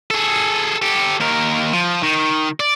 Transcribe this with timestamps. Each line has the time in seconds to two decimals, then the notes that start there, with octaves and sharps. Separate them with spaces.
0.10 G#4 A4
0.82 G4 A4
1.20 D#2 A#4
1.73 F3
2.03 D#3
2.60 D5